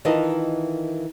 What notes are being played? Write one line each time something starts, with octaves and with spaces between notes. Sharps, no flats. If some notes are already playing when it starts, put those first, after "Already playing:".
D#3 E3 F4 A#4 D#5 A5